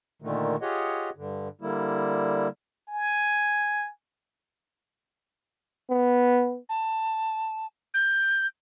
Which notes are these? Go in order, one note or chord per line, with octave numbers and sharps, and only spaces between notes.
A#2 D3 D#3 A3
F4 G4 G#4 C#5 D#5 F#5
G2 D3
D3 G3 A#3 E4
G#5
B3
A5
G6